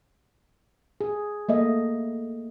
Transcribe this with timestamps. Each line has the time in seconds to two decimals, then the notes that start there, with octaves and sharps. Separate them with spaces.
1.01 G#4
1.49 A3 A#3 D#5 E5